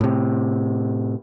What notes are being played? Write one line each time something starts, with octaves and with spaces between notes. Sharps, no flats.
A2 C3